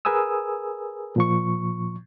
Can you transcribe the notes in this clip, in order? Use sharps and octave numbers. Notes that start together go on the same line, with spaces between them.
G#4 A#4 B4 G#5 D#6 E6
A#2 F3 C#6